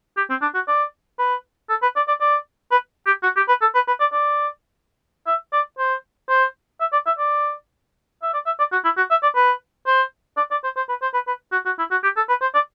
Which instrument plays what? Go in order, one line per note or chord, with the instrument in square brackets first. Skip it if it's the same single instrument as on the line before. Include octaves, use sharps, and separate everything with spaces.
[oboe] G4
C4
D4
F#4
D5
B4
A4
B4
D5
D5
D5
B4
G4
F#4
G4
B4
A4
B4
B4
D5
D5
E5
D5
C5
C5
E5
D5
E5
D5
E5
D5
E5
D5
F#4
E4
F#4
E5
D5
B4
C5
D5
D5
C5
C5
B4
C5
B4
B4
F#4
F#4
E4
F#4
G4
A4
B4
C5
D5